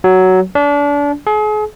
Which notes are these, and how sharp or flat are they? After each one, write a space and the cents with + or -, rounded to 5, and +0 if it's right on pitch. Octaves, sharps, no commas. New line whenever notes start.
F#3 +10
D4 -30
G#4 +40